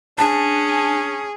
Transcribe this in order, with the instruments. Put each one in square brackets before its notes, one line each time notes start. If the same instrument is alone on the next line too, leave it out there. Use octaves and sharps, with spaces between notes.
[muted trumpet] C#4 [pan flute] D4 [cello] G#4 [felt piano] A5